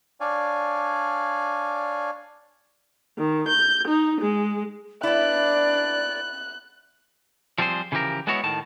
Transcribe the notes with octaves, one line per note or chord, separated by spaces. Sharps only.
D4 C#5 D5 F5 G#5
D#3
G6
D#4
G#3
B3 D4 E4 D5 F#6
F3 G3 C4 G#4 C5
C#3 E3 F3 G4 A#4
G#3 B3 E4 F#4 C#5
A2 D#3 A5